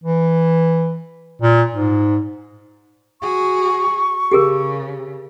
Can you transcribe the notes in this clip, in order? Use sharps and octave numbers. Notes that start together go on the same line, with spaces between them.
E3
A#2
G#2
F#4 G#4 C#6
C#3 G4 G#4 A#4